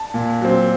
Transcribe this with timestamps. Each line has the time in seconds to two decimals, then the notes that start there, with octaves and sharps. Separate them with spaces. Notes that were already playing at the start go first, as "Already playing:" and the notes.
Already playing: A5
0.14 A#2
0.41 F#3 C4